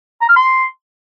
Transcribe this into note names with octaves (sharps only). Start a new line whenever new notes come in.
A#5
F6
C6